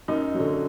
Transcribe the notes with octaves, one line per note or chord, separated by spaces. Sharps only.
F#2 D#4
F#3
D3